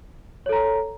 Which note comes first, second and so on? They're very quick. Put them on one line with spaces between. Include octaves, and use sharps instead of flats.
C#5 A4 A#5